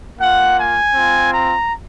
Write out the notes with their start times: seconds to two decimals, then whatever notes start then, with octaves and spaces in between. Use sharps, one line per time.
0.17 A#3 F4 F#5
0.56 G#5
0.94 C4 F4
1.32 A#5